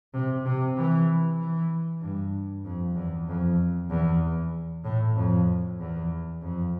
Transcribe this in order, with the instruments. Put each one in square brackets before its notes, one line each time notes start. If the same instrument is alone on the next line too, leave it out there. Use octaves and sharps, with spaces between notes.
[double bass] C3
C3
E3
E3
G2
F2
E2
F2
E2
A2
F2
E2
F2